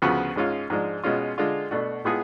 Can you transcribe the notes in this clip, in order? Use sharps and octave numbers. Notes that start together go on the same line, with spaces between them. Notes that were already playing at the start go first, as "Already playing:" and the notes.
D2 C#3 F3 B3 F#4
G#2 G#3 C#4 F4
G#2 F3 G#3 D4
B2 G#3 C#4 F4
D3 G#3 D4 F4
B2 A3 D4 F#4
A2 G#3 B3 F4 G#4